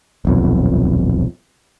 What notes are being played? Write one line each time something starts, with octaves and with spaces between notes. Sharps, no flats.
D#1 B1 F2